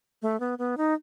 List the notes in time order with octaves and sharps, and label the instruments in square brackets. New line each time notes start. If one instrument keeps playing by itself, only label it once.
[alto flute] A3
B3
B3
D#4